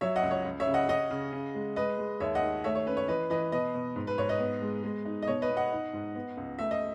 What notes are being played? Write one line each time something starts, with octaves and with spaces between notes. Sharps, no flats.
F#3 C#5 E5
D#5 F#5
C#2
C#5
C#2
C#5 E5
C#3
D#5 F#5
C#4 D#5 F#5
C#3
C#3
G#3
G#3 B4 D#5
G#3
D#2 C#5 E5
D#5 F#5
D#3
A3 C#5 E5
C#5
C#4 B4
C#5
E3 B4 D#5
E3 B4 D#5
B2 B4 D#5
B2
G#2
B4
G#2 C#5
B4 D#5
B3
G#3
G#3
D#4
D#5
B2 C#5
B4 D#5
B3
D#5 F#5
D#4
G#2
B3
C#2
A3 E5
D#5